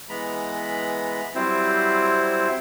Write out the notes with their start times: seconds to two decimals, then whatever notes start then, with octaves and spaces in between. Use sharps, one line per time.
0.09 E3 G#3 B3 A#5 B5
1.35 F#3 G3 C4 E4 C5